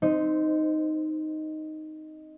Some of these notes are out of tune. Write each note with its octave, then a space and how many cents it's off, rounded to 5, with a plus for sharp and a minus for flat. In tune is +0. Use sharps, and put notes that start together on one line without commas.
C4 +0 D#4 +0 C5 -20